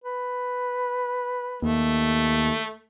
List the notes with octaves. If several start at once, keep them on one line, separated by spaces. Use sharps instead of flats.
B4
D#2 A3